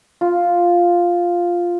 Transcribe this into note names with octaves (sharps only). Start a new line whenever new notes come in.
F4